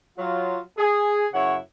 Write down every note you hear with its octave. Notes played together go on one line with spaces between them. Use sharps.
F#3 F4
G#4
F#2 C#3 E4 C#5 F#5